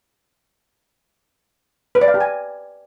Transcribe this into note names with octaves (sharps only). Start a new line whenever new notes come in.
B4
D5
F5
G4
G#5